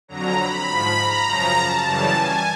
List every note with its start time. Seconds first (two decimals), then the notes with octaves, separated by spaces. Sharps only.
0.08 F2 D3 F#3 A#5
0.37 B5
0.67 G#2 F3
0.96 A#5
1.26 F#2 C#3 F3
1.54 A5
1.85 F#2 C#3 E3 G3 A5
2.14 G#5